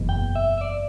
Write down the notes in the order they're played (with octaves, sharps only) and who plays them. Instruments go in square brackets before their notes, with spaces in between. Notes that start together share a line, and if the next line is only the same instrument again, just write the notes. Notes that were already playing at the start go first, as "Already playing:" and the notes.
Already playing: [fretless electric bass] F#1 E2 B2
[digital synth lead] G5
E5
E5
D5